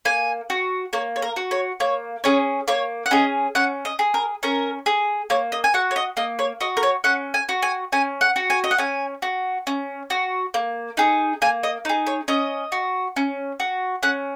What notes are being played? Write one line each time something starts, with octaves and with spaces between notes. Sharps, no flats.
A#3 G#5
F#4
A#3 C#5
C#5
A#4
F#4
C#5
A#3 C#5
C#4 G#4 C#5
A#3 C#5
F#5
C#4 G#4 D#5
C#4 F#5
D#5
G#4
A#4
C#4 A#4
G#4
A#3 C#5
D#5
G#5
F#4 F#5
C#5
D#5
A#3 D#5
C#5
F#4 D#5
A#4
C#5
C#4 F#5
G#5
F#4
G#5
C#4 G#5
F#5
F#4
G#5
D#5
F#5
C#4 G#5
F#4
C#4
F#4
A#3
D#4 G#4
A#3 G#5
D#5
D#4 G#4
C#5
C#4 D#5
F#4
C#4
F#4
C#4 F#5